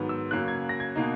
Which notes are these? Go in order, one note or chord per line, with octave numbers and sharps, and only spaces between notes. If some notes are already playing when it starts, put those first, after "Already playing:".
Already playing: G#2 D#3 F#3 B3
E6
F#2 C#3 F#3 A#3 F#6
G#6
A#6
G#6
B2 A#3 D#4